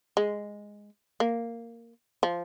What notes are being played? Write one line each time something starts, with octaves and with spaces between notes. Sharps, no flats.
G#3
A#3
F3